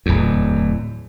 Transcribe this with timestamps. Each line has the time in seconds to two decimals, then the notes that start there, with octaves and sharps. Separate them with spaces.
0.06 D1 E2